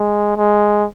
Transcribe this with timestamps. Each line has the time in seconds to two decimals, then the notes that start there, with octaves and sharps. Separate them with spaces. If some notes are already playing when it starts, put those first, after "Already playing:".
Already playing: G#3
0.37 G#3